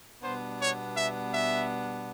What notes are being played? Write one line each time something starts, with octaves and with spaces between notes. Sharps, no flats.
B2 G3 B3 D4 C5
C#5
E5
E5